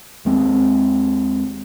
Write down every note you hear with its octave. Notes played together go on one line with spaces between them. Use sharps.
D#2 G#3 C4